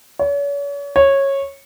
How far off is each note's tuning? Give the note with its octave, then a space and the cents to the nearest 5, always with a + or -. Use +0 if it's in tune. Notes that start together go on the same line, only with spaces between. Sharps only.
C#5 +40
C#5 -15